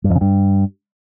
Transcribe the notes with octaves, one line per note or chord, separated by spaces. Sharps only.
G2
F2
C#3
G2